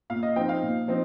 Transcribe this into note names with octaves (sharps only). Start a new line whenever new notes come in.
A#2 F5
D#5
F3 C4 D#4 G5
F5
A#2
F3 C4 D#4